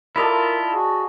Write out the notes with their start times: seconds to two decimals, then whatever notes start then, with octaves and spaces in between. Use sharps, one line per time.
0.16 E4 F4 A4 A#4 D5 D#5
0.73 F#4 G#4